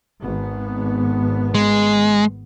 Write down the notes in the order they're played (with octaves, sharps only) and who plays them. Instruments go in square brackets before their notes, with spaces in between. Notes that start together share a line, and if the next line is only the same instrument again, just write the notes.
[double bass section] G#1 B3
[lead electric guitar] G#3